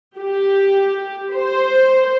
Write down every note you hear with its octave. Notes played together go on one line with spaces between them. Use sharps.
G4
C5